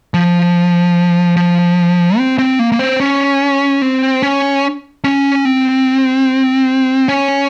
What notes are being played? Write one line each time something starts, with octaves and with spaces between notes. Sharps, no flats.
F3
F3
C4
C4
A#3
A#3
C4
C#4
C4
C#4
C#4
C4
C#4